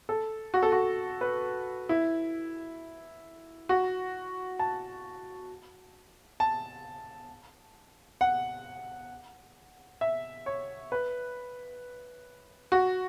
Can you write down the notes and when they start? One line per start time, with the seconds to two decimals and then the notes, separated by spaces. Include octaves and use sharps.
0.09 A4
0.54 F#4
0.63 A4
0.72 F#4
1.21 B4
1.89 E4
3.69 F#4
4.59 A5
6.40 A5
8.21 F#5
10.01 E5
10.46 C#5
10.92 B4
12.72 F#4